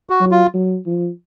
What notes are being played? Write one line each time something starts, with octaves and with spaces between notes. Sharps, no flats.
F#4
F#3
F4
F#3
F3